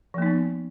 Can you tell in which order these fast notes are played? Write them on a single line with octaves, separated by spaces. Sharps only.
F3 A#3 D#4 B3